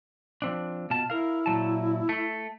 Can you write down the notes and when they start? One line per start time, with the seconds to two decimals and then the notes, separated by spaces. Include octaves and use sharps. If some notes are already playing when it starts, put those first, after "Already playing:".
0.42 F3 C4 D4
0.90 B2 F4 A5
1.10 E4 A#4 F5
1.46 A#2 F#3 A5
2.09 A3